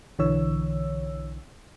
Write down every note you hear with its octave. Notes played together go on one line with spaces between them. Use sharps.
B1 D3 E3 C#5 E6